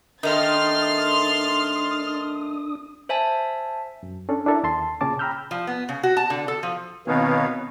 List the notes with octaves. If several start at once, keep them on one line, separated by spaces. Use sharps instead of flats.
D#3 A3 D4 C6 D#6 F6 A6
C5 E5 G#5 A5
F#2
C#4 D4 A4
D4 E4 A4 A#4 E5
D#2 A5 C6
A#2 C#3 C#4 G#4 A5 D6
G5 A#5 B5 E6 F6 G6
F3
B3
C#3
F#4
A5
D3
A4
F3
B2 D#3 B3 C4 B4 C#5 F5